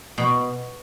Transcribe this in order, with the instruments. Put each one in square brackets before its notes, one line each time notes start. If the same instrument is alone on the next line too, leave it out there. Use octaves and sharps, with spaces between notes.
[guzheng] B2 B5